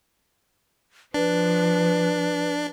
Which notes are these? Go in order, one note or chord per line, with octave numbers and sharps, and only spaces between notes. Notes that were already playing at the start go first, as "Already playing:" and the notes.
F3 D4 B4